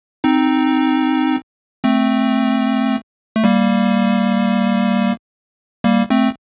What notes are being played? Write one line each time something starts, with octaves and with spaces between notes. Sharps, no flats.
C4 D#4
A3 C4
A3
G3 A#3
G3 A#3
A3 C4